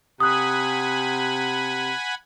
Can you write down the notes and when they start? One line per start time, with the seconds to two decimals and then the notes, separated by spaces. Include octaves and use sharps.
0.20 C3 F#5 G#5 B5 D#6 F#6